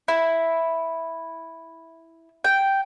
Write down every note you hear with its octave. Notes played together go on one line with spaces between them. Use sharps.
E4
G5